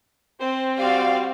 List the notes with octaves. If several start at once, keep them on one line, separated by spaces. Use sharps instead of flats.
C4 C5
G3 F#4 D5 F5